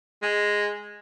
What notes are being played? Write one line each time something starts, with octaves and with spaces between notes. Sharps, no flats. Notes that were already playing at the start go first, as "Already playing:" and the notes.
G#3